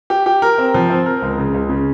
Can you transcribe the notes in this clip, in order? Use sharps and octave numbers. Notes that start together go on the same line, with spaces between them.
G4
G4
A#4
C4
F3
C4
A#4
C#2
C#3
C#2
C#3